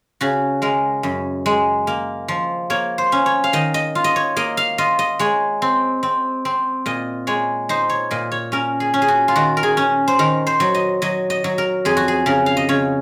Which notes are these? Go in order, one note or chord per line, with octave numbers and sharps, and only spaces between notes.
C#3 F#4
G#3 A#4
F#2
G#3
A#3
F3
A#3 C#5
C5
C#4
C#5
F5
D#3 D#5
D#5
F4
D#5
C#5
A#3 D#5
F5
F4 D#5
D#5
G#3 C#5
C4
C4
C4
A#2 D#5
G#3 C#5
D#4 C5
C#5
A#2 D#5
C#5
C#4 A#4
G#4
C#4
G#4
F#4
F4
D#3 F#4
A#4
G#4
C#4
C5
D#3 A#4
C5
F#3
D#5
F#3 D#5
D#5
F#3
A#4
F2 G#4
F#4
G#4
C#3 A#4
F5
D#5
C#3 C#5